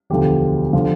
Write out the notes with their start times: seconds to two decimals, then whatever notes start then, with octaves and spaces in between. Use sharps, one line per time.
0.10 E1 D2 D3 F3 G4
0.73 D3 F3